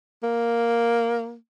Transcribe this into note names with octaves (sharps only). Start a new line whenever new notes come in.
A#3